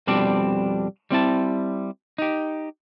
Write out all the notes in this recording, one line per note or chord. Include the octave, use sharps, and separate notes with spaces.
F2 B2 G3 C4 D4
G3 C4 E4 A5
D#4 G4